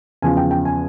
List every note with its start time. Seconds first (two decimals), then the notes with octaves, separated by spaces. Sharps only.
0.22 E2 C#3 F3 G#5
0.37 G5
0.51 G5
0.65 G#5